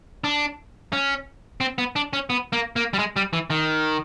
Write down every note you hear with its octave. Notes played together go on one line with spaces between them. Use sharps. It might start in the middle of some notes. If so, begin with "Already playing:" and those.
D4
C#4
C4
B3
D4
C#4
B3
A#3
A#3
G3
G#3
G3
E3
D#3